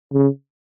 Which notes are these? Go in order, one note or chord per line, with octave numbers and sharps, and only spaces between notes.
C#3